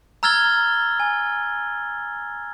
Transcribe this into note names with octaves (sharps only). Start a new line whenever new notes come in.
A#5 E6 F6 G#6 A6 G7
G#5